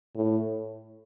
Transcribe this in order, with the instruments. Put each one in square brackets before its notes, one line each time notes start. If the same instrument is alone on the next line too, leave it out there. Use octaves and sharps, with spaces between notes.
[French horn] A2